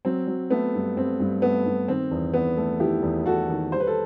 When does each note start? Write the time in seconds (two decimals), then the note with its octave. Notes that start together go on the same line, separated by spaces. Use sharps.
0.05 F#3 C4
0.27 F#3
0.50 A3 B3
0.74 G2
0.96 G2 C4
1.20 G2
1.42 A3 B3
1.66 G2
1.88 D#3 C4
2.11 E2
2.33 E2 B3
2.57 A3
2.80 D#3 E4 G4
3.02 E2
3.26 E2 F#4 A4
3.49 D#3
3.72 G3 C5
3.80 B4
3.87 A4